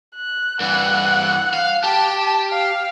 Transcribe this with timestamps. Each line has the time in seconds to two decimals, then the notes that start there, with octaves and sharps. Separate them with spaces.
0.15 F#6
0.60 G2 E3 F#5
1.54 F5
1.84 G4 A5
2.50 F5